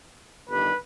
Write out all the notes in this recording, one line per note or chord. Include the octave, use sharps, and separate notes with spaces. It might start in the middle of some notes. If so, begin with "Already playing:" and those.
G1 G2 D#3 G3 B4